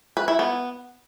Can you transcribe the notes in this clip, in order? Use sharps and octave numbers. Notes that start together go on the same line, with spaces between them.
B4
E4
B3